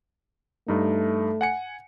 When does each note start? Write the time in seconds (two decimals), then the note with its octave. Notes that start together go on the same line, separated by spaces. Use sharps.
0.68 G2 A3 D#4
1.41 F#5 G#5 C#7